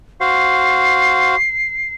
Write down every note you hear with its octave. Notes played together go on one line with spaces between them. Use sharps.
F#4 C5 F5 C7